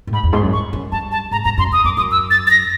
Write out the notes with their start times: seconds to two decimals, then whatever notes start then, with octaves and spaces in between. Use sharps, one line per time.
0.07 A2
0.12 G#2 B5
0.24 E2
0.33 G#2 C6
0.43 F#2
0.53 C#6
0.73 F#2
0.92 G2 A5
1.12 A5
1.31 G#2 A#5
1.44 G2 A#5
1.58 F#2 C6
1.71 F2 D#6
1.85 F#2 D6
1.97 F#2 D#6
2.11 E6
2.31 A6
2.47 A6
2.51 A#6